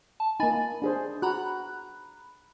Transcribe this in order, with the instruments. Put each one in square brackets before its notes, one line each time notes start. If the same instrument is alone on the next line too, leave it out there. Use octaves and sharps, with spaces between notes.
[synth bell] A5
[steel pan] A#3 D#4 [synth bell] G#5 B5 A6
[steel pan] D4 G#4 C5
[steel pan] F#4 [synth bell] A#5 B5 F#6